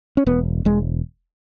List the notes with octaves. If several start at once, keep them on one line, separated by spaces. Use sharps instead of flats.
C#4
E1 B3
E1 G#3